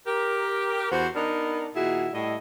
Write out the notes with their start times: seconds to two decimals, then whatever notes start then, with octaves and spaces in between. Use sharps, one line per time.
0.07 G4 A#4
0.92 E2 F#4 C5
1.16 B3 D4 D#4 A#4
1.75 A#2 D#3 E4 F#4 G#4
2.13 A2 G3 E4 D#5